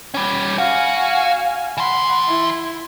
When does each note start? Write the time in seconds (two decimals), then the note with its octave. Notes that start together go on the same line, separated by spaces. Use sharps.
0.14 G3 C#4
0.58 F#4 F5 G#5
1.77 E3 F#5 B5 C6
2.28 E4